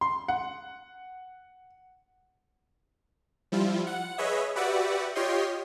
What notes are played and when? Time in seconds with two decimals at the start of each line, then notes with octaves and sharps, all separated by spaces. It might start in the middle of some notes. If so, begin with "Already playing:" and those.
0.01 C6
0.28 F#5
3.52 F3 G3 E4 F4
3.87 F#5
4.18 G#4 B4 C#5 D#5 E5
4.56 F#4 G4 B4 D5 E5 F#5
5.15 F4 G4 C#5 D#5 G5 C6